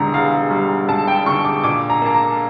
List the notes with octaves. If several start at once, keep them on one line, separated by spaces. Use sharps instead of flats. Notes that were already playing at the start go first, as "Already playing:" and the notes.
Already playing: E1 E2 D3 G3 A#5
E2 F5
G3
E1 A5
G5
D3 C#6
D6
A#2 D6
A#5
A#3 A5
A#5